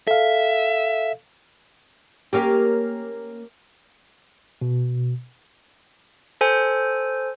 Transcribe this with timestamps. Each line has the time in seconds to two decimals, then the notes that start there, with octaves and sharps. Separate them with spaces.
0.07 A4 E5 F5
2.33 A#3 C#4 G4
4.61 B2
6.41 A4 C5 G#5